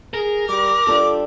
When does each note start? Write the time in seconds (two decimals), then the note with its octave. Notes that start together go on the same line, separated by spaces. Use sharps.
0.14 G#4 A#4
0.49 G3 D6
0.87 G3 D4 F4 A4